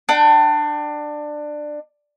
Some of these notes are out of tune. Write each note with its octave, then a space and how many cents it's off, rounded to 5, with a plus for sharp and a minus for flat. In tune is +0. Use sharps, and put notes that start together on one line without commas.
D4 +20 G5 -35